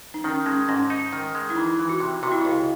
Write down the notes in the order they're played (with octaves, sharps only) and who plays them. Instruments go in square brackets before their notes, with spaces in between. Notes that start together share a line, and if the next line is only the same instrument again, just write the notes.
[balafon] D#4
[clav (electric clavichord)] D#3 [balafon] C#4
[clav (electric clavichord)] G#3 [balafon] C#4
[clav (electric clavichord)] G#2 [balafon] C#4
[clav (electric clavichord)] D#4
D#3
G#3
[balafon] E4
[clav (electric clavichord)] E3 [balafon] D#4
[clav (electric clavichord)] E3
[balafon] F#4
[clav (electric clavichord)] C3
[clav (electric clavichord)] C3 [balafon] F#4
[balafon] E4
[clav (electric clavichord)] C#2 [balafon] F#4